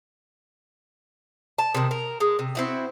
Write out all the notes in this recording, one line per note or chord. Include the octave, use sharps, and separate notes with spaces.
A5
C3 D#3
A#4
G#3
C3
C4 E4 F#4